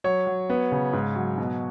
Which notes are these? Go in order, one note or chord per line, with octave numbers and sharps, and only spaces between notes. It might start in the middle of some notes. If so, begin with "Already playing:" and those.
F#3 C#5
F#3
B3
C#3
G#2
F#3
B2